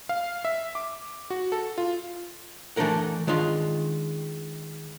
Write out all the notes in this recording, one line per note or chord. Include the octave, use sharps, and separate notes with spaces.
F5
E5
D6
F#4
A4
F4
E3 A3 D4 A4 A#4 F#5
D#3 G#3 D4 F4 C6